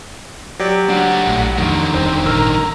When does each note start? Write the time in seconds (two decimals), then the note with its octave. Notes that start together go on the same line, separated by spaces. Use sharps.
0.59 F#3 G4 D5
0.89 D4 F#4 F#5
1.27 A#1 A2
1.58 F2 D3 D#3 F3 A3
1.92 E1 G3 C4
2.26 G#1 A#2 G3 A#4 A#5 E6